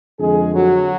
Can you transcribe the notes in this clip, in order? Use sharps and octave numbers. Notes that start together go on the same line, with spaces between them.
F2 D3 G#3 G#4
F#3 F#4